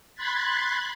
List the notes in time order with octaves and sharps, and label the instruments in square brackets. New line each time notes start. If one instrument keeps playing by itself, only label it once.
[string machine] B5 C6 F#6 G#6 A6 B6